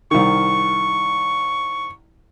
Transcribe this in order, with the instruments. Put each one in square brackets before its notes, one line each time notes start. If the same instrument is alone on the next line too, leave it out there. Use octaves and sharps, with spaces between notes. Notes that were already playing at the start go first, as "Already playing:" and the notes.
[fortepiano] C2 D#3 [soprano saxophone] C#6